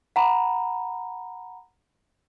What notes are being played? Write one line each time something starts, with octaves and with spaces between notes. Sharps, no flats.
F#5 A#5 B5